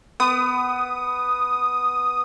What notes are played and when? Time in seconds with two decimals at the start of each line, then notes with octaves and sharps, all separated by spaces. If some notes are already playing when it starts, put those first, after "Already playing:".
0.20 B3 D#6